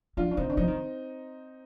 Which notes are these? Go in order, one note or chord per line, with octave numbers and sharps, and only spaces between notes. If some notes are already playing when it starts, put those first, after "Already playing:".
F3 D4 F4
D4
D#3 C4 D#4
D4
F3 C4 D#4
D#3